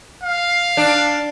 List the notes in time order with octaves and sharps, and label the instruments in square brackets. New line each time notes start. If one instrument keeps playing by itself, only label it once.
[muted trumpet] F5
[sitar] D4